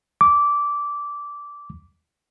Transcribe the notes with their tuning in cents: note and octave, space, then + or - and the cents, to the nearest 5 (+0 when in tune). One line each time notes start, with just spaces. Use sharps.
D6 -15